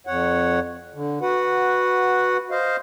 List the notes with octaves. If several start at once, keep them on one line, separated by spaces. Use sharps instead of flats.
F2 C#5 F#5
D3
F#4 B4 F#5
C5 D#5 F5